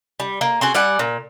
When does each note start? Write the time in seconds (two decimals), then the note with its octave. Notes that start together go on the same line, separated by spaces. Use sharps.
0.20 G3
0.41 A#3
0.61 C4 F#4 G#4
0.74 G3 D5 F#5 G#5
0.99 A#2